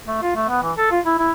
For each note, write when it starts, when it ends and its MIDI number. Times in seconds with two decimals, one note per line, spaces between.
0.07 0.18 57
0.22 0.31 65
0.36 0.45 57
0.49 0.63 59
0.63 0.72 52
0.78 0.87 69
0.91 1.00 65
1.06 1.16 64
1.19 1.32 64